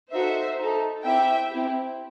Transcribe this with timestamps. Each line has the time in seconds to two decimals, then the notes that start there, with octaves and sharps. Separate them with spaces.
0.13 D#4 F#4 A4 C5 E5
0.59 D#4 A4
1.04 C4 E4 G4 E5 G5
1.50 C4 E4 G4